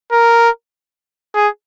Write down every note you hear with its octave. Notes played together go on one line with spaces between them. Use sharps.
A#4
G#4